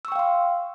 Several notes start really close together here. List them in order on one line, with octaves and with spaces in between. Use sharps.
E6 C#6 G5 F5 C6